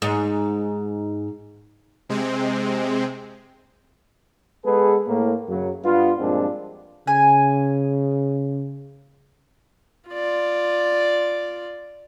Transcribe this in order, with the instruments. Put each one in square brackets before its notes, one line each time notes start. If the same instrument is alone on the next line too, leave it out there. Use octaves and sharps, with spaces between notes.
[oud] G#2
[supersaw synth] C3 G#3 C4
[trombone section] G#3 B3 G#4 A4 B4
A2 A#3
F#2 C#3 F#3
G2 B3 F4
G2 A#2 F3 G#3 C4 D4
[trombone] C#3 [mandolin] G#5
[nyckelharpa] F4 D5